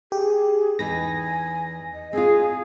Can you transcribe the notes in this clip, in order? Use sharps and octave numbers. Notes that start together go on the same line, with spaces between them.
G4 G#4
E2 D#4 B4 G#5 A#6
D#5
C4 D4 F4 G#4 G#5